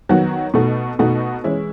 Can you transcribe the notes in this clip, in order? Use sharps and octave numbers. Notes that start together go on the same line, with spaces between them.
D#3 F#3 B3 F#4
B2 A3 D#4 F#4
B2 A3 D#4 F#4
E3 G#3 C#4 E4